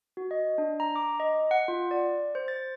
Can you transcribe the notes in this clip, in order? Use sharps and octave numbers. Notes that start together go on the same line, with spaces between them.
F#4
D#5
D4
A#5
D6
D#5
F#5
F4
D5
C5
A6